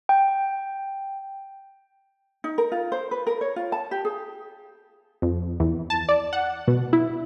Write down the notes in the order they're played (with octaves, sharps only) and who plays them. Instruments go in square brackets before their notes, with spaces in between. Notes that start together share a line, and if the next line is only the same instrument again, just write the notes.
[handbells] G5
[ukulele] D#4
A#4
F4
C5
B4
A#4
C#5
F4
A5
G4
G#4
[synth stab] F2
E2
A5
D5
F#5
B2
E4